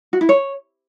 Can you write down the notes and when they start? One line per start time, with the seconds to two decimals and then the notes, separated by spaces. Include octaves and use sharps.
0.13 F#4
0.21 E4
0.29 C#5